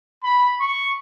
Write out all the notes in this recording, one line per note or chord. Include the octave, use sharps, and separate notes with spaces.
B5
C#6